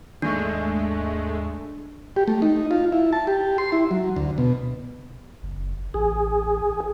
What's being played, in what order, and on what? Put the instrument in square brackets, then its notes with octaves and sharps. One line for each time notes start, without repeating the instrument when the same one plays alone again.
[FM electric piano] D#2 G#2 C#6 [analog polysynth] G#3 A3 [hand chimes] D4
[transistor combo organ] G4
A3
D#4
F4
E4
A5
G4
C6
E4
F#3
D2
B2
[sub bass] F#1
[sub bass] A1 [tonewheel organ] G#4